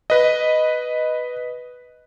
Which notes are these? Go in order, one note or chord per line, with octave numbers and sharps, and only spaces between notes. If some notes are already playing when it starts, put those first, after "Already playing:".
B4 D#5